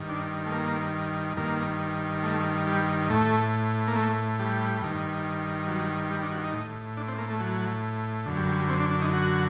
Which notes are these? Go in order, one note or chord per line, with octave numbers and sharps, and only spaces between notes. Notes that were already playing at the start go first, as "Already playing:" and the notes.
Already playing: G2 D#3
D4
A3
A#3
G2 D#3 A#3
A3
G3
A2 A3
A#3
A3
G3
G2 D#3
F#3
G3
D4
F#4
D#4
A2
D4
C4
A#3
A3
F#3
F#2 D3
G3
G3
G3
C4
D4
D4
D#4
F#4